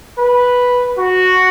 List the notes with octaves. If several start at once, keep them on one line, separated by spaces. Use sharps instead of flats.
B4
F#4